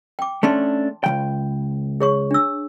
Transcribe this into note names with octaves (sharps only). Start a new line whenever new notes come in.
G5 D6
A3 C#4 D4 A5 C6
C#2 D#3 G5
G#4 C#5 C#6
D4 E6